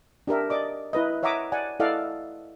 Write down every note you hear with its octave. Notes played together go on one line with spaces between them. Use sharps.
D4 G4 A#4 E5
D5 D#5 D6
E4 B4 D#5
C#5 E5 F#5 A#5 D6 D#6
D5 F#5 G#5
E4 A4 D5 D#5 F5 F#5